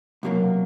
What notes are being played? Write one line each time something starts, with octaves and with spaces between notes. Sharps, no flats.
C2 B2 F#3 A#3